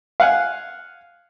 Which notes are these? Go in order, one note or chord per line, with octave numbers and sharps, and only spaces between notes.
F5 F#5 G#5